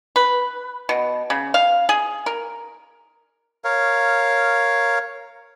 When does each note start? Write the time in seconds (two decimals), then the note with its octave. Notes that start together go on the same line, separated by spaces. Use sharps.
0.16 B4
0.89 B2
1.30 C#3
1.54 F5
1.89 G#4
2.26 A#4
3.64 A#4 C#5 F5